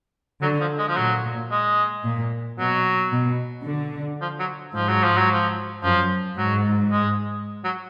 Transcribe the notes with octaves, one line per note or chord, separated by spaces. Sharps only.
D3 F#3
F3
G#3
F3
A#2 F#3
G#3
A#2
B2 F#3
B2
D3
F3
F#3
G#2 F3
F#3
F3
F#3
F3
F#2 F3
G#2 F#3
G#3
F#3